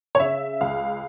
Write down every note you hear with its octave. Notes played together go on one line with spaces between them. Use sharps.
C#5
C#3 E5
C#2 F5